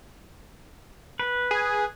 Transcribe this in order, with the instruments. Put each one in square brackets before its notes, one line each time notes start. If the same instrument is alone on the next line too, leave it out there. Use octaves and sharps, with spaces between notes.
[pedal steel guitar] B4
[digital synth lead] G#4